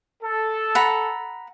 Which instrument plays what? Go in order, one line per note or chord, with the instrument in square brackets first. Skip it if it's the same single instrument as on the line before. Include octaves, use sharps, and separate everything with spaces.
[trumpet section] A4
[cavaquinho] F#5 A#5 B5